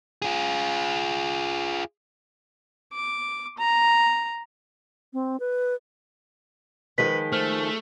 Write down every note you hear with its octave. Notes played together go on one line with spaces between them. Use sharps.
F4 G#4
D6
A#5
C4
B4
D#3 F3 G#3 B4 B6
A3 C5 F6